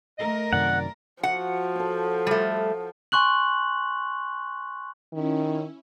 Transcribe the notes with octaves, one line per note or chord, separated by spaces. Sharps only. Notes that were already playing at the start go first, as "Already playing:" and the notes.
A3 A#4 D#5
F#2 C3 D#3 D5 F#5
F3 F#4 F#5
A4 C#5
G3 A3
G#5 C6 C#6 F#6 F#7
D#3 C#4 E4